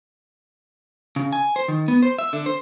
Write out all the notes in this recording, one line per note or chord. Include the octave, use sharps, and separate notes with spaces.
C#3
G#5
C5
D#3
B3
C5
E5
D3
C5